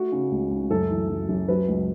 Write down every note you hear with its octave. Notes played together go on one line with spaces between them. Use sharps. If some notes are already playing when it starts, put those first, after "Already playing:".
Already playing: A3 F#4
C#3
C#2
C#2
F#2 A4
E3
F#2
F#2
F#3 B4
C#2